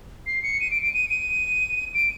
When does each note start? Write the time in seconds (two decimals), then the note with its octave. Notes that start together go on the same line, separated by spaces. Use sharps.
0.26 C7
0.43 C#7
0.60 D#7
0.71 D7
0.82 D7
0.94 D#7
1.10 D#7
1.94 D7